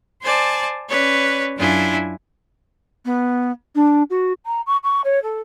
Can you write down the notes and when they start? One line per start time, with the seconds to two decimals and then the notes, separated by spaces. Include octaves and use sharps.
0.22 C5 D5 G#5 A5
0.89 C#4 B4 C#5 D5
1.57 F#2 D4 E4 F4 G#5
3.06 B3
3.75 D4
4.10 F#4
4.46 A#5
4.66 C#6
4.83 C#6
5.04 C#5
5.22 A4